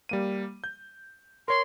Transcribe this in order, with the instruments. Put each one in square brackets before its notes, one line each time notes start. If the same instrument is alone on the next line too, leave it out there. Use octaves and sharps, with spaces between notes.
[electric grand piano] G3 A#3 D#7
G6
[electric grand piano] A#4 C#5 [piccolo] C6